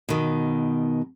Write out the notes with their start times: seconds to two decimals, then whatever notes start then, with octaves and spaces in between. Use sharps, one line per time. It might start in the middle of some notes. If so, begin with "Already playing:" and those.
0.09 B2 D#3